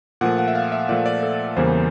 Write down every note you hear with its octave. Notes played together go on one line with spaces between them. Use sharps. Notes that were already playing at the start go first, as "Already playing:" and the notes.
A#2 F3 A3 F#5
F#5
E5
F5
E5
A#2 F3 A3 D5
D5
A4
E2 C#3 E3 G3 A#3 C5